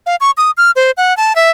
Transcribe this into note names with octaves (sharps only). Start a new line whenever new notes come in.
F5
C#6
D#6
F6
C5
F#5
A5
E5